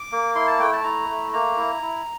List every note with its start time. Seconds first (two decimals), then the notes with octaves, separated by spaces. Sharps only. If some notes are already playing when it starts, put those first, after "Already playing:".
Already playing: D6
0.12 A#3
0.36 E4 C6
0.47 A5
0.60 A3 G5
0.73 A5
0.84 E4 A#5
1.09 A3
1.33 A#3 A#5
1.57 E4
1.82 E4